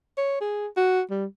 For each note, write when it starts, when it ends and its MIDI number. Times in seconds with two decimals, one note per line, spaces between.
0.18 0.41 73
0.41 0.67 68
0.77 1.01 66
1.10 1.25 55